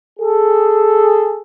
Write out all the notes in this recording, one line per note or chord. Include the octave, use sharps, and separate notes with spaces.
G#4 A4